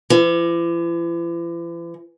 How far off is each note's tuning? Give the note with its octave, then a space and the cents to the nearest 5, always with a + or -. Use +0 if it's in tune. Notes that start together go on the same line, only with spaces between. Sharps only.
E3 +45